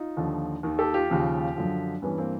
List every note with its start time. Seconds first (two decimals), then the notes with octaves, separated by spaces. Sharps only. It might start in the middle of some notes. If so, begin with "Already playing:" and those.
Already playing: D#4 F4
0.17 D#2 D3 F3
0.63 D#2 D#3
0.79 G4 A4
0.94 F4 G4
1.10 D#2 C#3 F3
1.56 F#2 D3 F3
2.02 G2 E3 B3 C#4
2.18 A#3 C4